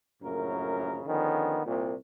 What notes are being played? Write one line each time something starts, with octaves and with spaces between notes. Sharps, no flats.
A#1 F#2 A2 C#3 A#4
D3 D#3 F3 B3 C#4
C2 A#2